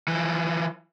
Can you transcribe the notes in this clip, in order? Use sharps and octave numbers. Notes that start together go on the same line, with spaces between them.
E3 F3